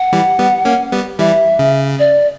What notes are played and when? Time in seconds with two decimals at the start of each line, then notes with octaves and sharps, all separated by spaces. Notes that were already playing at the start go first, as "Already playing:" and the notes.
Already playing: F#5
0.13 E3 G3
0.39 G3 B3
0.65 A#3 C#4
0.92 G3 B3
1.19 E3 G3 E5
1.59 C#3
1.99 D5